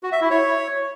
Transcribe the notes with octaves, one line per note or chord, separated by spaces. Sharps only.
F#4
E5
E4
C#5